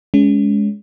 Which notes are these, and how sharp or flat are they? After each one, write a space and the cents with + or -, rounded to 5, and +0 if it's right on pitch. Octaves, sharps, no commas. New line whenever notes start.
G#3 +0 C#4 +25